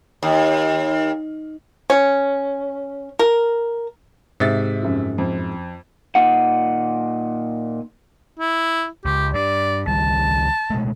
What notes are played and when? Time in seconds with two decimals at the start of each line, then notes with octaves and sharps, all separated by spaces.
0.23 D#2
1.90 C#4
3.19 A#4
4.40 G#2 C3 E5 A6
4.83 F#2 F3
5.18 F2
6.15 A#2 D#4 F#5
8.40 E4
9.05 C#2 G4
9.34 G2 D5
9.87 C#2 D#3 G3 A5
10.70 B2 G#3 A3